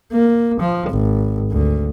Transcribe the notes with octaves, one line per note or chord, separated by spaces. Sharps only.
A#3
F3
G#1
D2